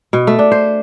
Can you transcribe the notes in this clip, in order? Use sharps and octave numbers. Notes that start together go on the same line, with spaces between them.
B2
A3
D4
C5